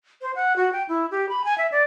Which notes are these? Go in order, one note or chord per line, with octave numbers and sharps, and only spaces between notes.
C5
F#5
F#4
G5
E4
G4
B5
G#5
E5
D5